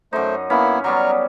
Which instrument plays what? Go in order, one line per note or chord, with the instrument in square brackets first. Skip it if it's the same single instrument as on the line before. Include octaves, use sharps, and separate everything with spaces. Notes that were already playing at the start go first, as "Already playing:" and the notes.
[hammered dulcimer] F#2 D#4 [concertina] A3 C5
[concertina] A#3 B3 E4 [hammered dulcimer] C#4
[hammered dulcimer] F#3 G3 B3 [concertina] A#5 C#6 F6